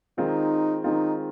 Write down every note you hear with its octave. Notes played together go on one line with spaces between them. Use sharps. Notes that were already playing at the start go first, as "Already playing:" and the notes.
D#3 G#3 C4 D#4 F4
D#3 G#3 C4 D#4 F4